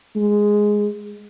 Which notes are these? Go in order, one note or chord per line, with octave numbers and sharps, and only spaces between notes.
G#3